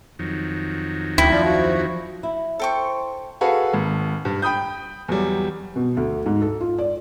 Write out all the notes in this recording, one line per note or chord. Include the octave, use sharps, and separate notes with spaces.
F2 D#3 F#3
D2 E4 G5
F3 D5
F#4
E4
A4 C5 G5 C#6
F#4 G#4 A4 B4 F5
G#1
G2
G5 B5 D#6 G6
E2 F#3 G3
B2
D2
G#2
A4
F4
D5